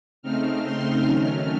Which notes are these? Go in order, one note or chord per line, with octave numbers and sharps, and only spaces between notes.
C#3 A3 C4 D#4 F6
C6
D#3 F#3 A3 C#4 F6